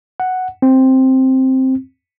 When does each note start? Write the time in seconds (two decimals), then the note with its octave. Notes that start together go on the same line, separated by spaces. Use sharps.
0.20 F#5
0.62 C4